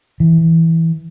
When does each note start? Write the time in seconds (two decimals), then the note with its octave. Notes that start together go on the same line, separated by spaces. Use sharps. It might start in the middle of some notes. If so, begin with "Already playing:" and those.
0.20 E3